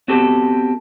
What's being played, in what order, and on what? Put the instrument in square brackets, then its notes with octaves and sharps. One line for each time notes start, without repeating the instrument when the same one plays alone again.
[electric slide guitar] B3 C4 F#4 G4 A4